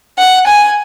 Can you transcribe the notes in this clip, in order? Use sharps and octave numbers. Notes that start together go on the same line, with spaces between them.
F#5
G#5